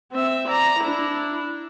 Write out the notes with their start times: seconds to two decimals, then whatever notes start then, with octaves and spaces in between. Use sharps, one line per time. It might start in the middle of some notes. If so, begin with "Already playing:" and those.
0.12 C4 E5
0.48 D5 A#5
0.80 D4 E4